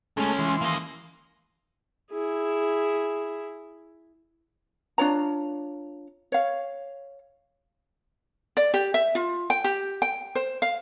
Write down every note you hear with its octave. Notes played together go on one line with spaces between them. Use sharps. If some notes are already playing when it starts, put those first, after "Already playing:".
C#2 G#3 A3 C#4
E3 C6
A#3 D#5
E4 G#4
D4 F4 C#5 A#5
C#5 F5
D5
G4
E5
F4
G5
G4
G5
C5
F5